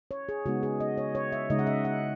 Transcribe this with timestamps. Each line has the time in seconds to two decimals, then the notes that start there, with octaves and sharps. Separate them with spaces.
0.11 C#5
0.29 G#4
0.45 C#3 G#3 B3 D#4 F#4
0.63 G#4
0.80 D#5
0.98 C#5
1.15 C#5
1.32 E5
1.50 C#3 G#3 D#4 D#5
1.59 F#5
1.67 E5
1.85 F#5